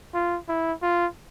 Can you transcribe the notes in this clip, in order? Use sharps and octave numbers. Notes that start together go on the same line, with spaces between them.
F4
E4
F4